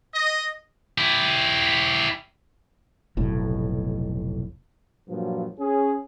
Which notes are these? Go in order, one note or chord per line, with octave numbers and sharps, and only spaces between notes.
D#5
E4 G4
F1 B1 A2
G2 A#2 F3 F#3
C#4 G#4